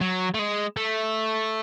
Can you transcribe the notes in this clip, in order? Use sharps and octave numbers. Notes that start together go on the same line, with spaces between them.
F#3
A3
G#3
A3